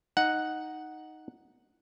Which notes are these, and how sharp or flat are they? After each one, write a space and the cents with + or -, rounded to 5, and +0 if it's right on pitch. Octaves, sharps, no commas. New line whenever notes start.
D#4 +0 F#5 +0